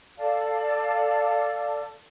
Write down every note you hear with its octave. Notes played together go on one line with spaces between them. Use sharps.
A4 D5 F5 A5